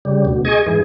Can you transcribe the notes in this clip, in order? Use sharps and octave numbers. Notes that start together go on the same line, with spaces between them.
C#3 G3
D2 B2
G#4 D#5 G#5 C#6
G#2 E3 G#4